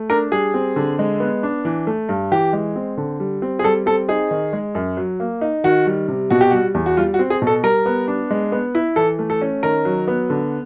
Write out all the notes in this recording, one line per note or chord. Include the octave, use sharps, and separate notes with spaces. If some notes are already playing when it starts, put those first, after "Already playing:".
Already playing: A3
D4 A#4
G3 G#4
C4
D3
G#3
B3
D4
E3
A3
G2
E3 G4
G#3
C4
D3
G3
C4
G#4
G3 A4
C4 A4
D#4 G#4
D#3
G#3
F#2
F#3
A#3
D#4
D#3 F#4
G3
C3
B2 F#4
G4
G3 F#4
E2
F#4
G3 F4
F#4
C4
G#4
B2
A4
G3 A#4
B3
D4
G#3
B3
E4
E3 A4
A3
A4
C#4
D#3 A#4
F#3
B3
D3